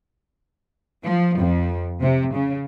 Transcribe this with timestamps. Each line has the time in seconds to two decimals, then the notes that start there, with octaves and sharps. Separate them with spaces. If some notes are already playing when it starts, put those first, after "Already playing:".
1.03 F3
1.38 F2
2.00 C3
2.33 C#3